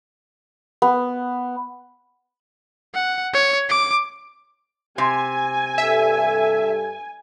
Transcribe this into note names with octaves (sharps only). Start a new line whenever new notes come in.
B3
F#5
C#5
D6
C3 G#5
G2 A4 E5